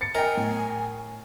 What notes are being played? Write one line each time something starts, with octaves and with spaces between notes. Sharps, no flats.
A6 C#7
A#4 D#5 G5 G#5
A2